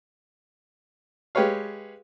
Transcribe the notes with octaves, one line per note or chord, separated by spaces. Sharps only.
G#3 G4 B4 C#5 F5